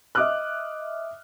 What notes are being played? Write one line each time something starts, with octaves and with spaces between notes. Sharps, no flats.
D#5 E5 D6 D#6 F6 F#6